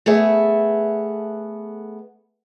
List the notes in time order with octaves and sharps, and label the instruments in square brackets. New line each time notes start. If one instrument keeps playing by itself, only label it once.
[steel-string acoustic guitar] A3 B3 G#4 E5